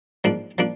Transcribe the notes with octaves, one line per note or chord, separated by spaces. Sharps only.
G#2 F3 A#3 D4
F3 A#3 D4